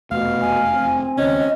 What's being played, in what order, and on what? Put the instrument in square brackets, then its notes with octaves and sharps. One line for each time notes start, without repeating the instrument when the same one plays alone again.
[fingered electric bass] F1 E2 A3 [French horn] B2 [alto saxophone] F5
[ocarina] G#5
[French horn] C4
[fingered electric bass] D#2 C#3 [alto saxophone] C#4 [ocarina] D#5